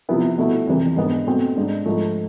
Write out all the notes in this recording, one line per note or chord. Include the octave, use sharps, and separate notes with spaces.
C3 F3 B3 E4
B2 A3 E4
F2 C3 E3
G#2 G#3 B3 D4
B2 A3 C4
G#2 G#3 D4
G#2 F3 A3